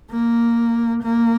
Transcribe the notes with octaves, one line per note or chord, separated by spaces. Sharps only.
A#3
A#3